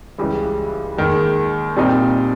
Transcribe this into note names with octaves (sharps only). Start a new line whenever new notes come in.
C#2 C#3 E3 G3
D#2 D#3 G#3
A#2 G3 C4 D#4